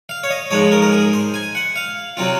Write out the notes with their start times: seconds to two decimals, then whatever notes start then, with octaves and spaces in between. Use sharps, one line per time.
0.09 F5
0.23 C#5
0.30 D#5
0.51 G#2 F3 G#3 C#5
0.72 A#4
0.82 A#4
0.92 G#4
1.13 C5
1.34 G#5
1.55 F#5
1.76 F5
2.17 C3 F#3 C4 F4